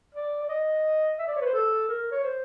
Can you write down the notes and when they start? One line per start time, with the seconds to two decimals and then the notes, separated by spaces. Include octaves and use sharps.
0.15 D5
0.43 D5
0.49 D#5
1.19 E5
1.28 D5
1.37 C#5
1.41 B4
1.46 C5
1.54 A4
1.89 A#4
2.12 C#5
2.24 C5